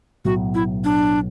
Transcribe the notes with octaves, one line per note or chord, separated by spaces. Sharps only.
B1 A2 F#3 B3 F#4
E4
D4